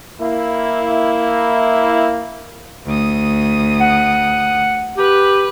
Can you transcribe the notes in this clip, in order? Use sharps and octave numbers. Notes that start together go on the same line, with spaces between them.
A#3 E4
D2 D#6
F#5
G4 B4 F#6